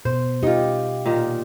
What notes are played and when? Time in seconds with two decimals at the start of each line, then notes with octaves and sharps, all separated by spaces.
0.05 B2 C5
0.43 D#4 F4 G4
1.06 A#2 D#3